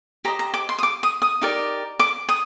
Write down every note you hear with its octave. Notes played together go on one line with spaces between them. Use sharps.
G4 C5 D#5 A#5
A#5
D6
C6
D#6
D6
D#6
D#6
D#4 G4 A#4 D5
D6
D#6